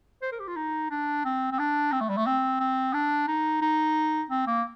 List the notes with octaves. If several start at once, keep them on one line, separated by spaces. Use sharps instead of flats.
C5
A#4
G4
F4
D#4
D4
C4
C4
D4
C4
A3
G3
A3
C4
C4
D4
D#4
D#4
C4
A#3